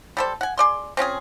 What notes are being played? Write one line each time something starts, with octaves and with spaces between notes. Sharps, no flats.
G3 A4 C5
F#5 G#5
G#4 D5 C6
C4 C#4 F4 G#4